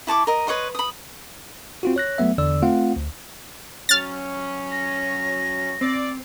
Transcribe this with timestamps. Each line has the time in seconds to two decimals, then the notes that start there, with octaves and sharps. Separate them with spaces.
0.07 E4 A5 C#6 D6
0.27 A#4 D#5
0.47 B4 C#5 D#5 C6
0.75 B5 D#6
1.83 C4 F4 F#4
1.96 C#5 F#6 A#6
2.18 F#3 A3 B3 E5
2.38 E2 D3 D5 E6
2.62 A3 C4 F4 F5 F#5
2.96 D2
3.89 F#3 C#4 F6 A6
4.72 A#6
5.81 C4 D5